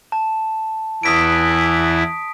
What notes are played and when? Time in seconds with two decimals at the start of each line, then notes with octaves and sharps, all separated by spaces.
0.12 A5
1.03 E2 E3 E4 D#6 B6 D7